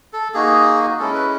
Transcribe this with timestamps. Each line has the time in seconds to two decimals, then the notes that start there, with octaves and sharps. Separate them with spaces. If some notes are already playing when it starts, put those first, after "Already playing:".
0.13 A4
0.34 A#3 D#4 F#4 G#4
0.99 G#3 C#4 E4 A4
1.15 B4